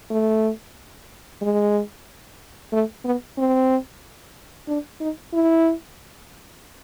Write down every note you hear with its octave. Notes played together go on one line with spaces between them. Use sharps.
A3
G#3
A3
B3
C4
D4
D#4
E4